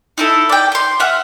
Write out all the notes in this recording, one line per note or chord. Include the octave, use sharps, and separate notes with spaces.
D#4 E4 A4
D5 G5
G5 C6
E5 F#5 F6